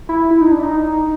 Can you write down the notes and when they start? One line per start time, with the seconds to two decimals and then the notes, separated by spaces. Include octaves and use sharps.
0.09 E4
0.31 E4
0.41 D#4
0.51 D4
0.63 D#4